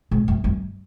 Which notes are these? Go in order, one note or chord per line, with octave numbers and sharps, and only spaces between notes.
G#2
F#2
F#2